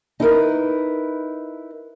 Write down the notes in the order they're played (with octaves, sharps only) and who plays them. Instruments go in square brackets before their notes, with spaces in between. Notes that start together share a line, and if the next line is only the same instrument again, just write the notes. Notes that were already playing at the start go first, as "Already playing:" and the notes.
[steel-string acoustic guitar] D#4 E4 A#4 B4